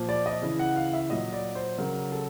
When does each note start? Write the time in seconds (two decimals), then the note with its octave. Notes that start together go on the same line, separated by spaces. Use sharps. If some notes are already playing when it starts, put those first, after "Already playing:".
Already playing: A#2 F3
0.09 D5
0.26 D#5
0.42 C#3 E3
0.59 F#5
0.76 F5
0.93 E5
1.10 A#2 F#3 D#5
1.33 D5
1.55 C5
1.78 C#3 F#3 A#4
2.12 A4